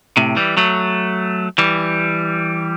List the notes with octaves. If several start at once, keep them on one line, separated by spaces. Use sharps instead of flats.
A2 C3
E3 G3
F#3 A3
E3 G3